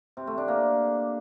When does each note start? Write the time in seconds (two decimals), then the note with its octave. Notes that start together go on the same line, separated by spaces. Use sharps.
0.17 C3
0.27 A3
0.38 D4
0.48 A#3